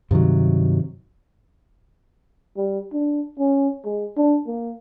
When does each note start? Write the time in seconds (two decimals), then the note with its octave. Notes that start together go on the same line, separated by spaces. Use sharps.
0.11 G2 C3 D#3 F#3
2.57 G3
2.93 D4
3.39 C#4
3.85 G#3
4.17 D4
4.47 A#3